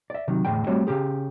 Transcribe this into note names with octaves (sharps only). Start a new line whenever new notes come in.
D5 E5
C3 D#3 F#3
E2 A2 D3 G#3 G5
G3 A3 C4 D4 F#4 C#5
C#3 C#4 G4 G#4